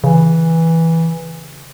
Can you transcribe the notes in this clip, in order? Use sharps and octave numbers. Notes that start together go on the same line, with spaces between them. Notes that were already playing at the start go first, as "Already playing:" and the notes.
C#3 E3